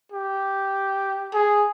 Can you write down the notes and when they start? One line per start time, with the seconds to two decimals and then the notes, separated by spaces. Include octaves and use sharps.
0.13 G4
1.34 G#4